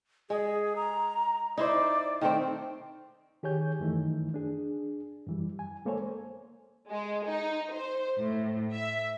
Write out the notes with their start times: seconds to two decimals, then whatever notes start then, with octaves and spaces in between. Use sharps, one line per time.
0.30 G#3 G#4
0.76 A#5
1.58 D#4 E4 C5 D5
2.21 D#3 A3 C4 G5
3.43 D#3 G4 G#4 C#5 G#5 G6
3.80 F#2 D#3 E3 A3 D#4
4.34 D4 G#4
5.27 F#2 E3 G3
5.59 G#5
5.85 G#3 A#3 A4 C5 C#5 G#5
6.89 G#3
7.26 D#4
7.72 C5
8.16 A2
8.72 E5